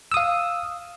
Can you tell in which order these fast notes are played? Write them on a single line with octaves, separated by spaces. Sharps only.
E6 D#6 F5